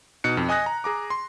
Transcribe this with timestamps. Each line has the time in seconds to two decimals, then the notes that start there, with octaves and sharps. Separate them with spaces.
0.24 B2 D#4 F#6 C#7
0.37 F2
0.49 D#5 G#5 D#6 F#6 A#6
0.66 A#5
0.84 G#4 A#5 D6
1.10 C6